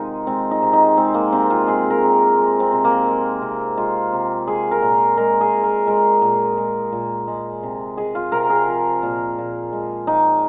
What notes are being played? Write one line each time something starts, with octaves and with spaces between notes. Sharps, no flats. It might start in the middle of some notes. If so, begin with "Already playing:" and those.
Already playing: C3 D#3 G#3 D#4 F4
G#3 C4
D#4
C3
D#4
G#3 C4
A#3
C3 C4
F4
G#3 G#4
A#4
C3
G#3
C4
C3
A#3
G#3
C3
G#3 F4
C3
G#3 G#4
A#4
A#2
G#3 A#4
G#4
A#2
A#4
G#3 A#4
A#2
G#3
A#2
G#3
C3
G#3 G#4
F4
C3 A#4
G#4
F3
A#2
A#2
G#3
F3 D#4